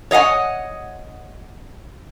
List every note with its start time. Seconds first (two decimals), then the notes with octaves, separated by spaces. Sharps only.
0.11 C#5 D#5 F5 F#5 G#5